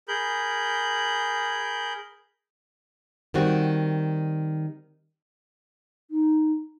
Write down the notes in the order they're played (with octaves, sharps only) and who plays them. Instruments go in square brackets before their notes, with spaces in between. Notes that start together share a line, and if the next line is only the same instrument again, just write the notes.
[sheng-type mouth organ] G#4 A#4 B5 G6
[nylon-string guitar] D#3 G3 C4 F#4
[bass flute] D#4